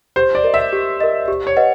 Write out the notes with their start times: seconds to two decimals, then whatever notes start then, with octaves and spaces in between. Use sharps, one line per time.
0.16 G4 C5
0.35 D5
0.44 A#4 D#5
0.54 E5
0.73 G4
1.00 A#4 D#5
1.28 G4
1.47 C#5
1.57 B4 D#5 F#5